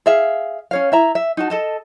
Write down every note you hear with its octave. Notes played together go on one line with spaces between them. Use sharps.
G#4 E5 F5
C#4 C#5 F5
E4 E5 A#5
E5
D#4 F#4 A5
A4 D#5 A5